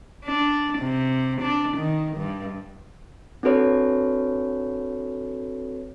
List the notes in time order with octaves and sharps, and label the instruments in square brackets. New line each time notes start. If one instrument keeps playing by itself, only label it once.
[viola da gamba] D4
C3
D4
D#3
G2
[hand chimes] C4 D4 F#4 A4 B4 C#5